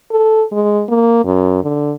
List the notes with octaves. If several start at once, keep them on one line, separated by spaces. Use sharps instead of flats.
A4
G#3
A#3
F#2
D3